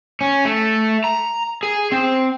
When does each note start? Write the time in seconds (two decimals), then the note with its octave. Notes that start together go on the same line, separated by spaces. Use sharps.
0.21 C#4
0.45 A3
1.04 A#5
1.63 G#4
1.92 C4